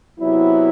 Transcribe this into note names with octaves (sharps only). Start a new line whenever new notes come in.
C3 F#3 B3 E4